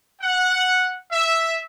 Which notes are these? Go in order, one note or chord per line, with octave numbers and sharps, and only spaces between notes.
F#5
E5